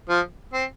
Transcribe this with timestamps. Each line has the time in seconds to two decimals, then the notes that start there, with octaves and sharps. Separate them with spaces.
0.09 F3
0.54 C4